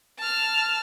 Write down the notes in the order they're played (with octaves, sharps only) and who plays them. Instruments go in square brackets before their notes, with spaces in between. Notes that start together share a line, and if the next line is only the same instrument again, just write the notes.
[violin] A5 F6